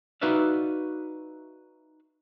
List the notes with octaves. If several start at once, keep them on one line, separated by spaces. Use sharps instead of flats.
D#4 F#4 B4 D5 E5 F5